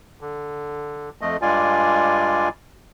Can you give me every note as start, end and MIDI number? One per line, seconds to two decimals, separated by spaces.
0.21 1.09 50
1.21 1.37 41
1.21 1.37 57
1.21 1.37 75
1.42 2.49 43
1.42 2.49 56
1.42 2.49 65
1.42 2.49 74
1.42 2.49 80